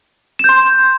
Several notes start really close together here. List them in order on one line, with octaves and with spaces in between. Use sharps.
E7 G6 C6